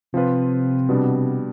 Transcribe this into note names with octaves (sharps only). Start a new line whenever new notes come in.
C3 F3 C4 F4 B4
B2 G3 B3 D4